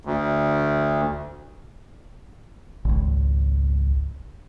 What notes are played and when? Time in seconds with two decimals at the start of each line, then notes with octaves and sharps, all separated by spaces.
0.05 D2
2.85 G#1 C#2